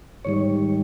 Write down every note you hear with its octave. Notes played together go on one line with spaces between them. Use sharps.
G#2 D#3 G3 C#5